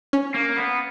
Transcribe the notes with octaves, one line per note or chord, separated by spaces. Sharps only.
C#4
A#3
B3